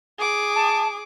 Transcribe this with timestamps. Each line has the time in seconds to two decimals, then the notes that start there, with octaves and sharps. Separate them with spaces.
0.18 G#4 D6
0.55 A5